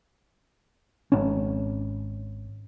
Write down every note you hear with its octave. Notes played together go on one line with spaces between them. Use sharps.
G#1 C#4